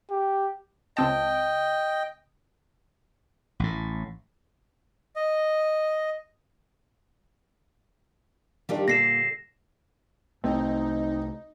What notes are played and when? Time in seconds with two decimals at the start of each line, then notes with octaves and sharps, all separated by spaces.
0.11 G4
0.97 C#2 C4 D#5 G5 A5
3.60 A1 A2
5.16 D#5
8.69 D#3 G3 D4 F4 G4
8.88 A#2 D3 A4 A#6 C7 E7
10.44 C2 A3 C4 D#4